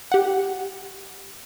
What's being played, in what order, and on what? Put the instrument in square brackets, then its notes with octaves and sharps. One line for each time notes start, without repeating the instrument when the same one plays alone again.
[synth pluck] G4 F#5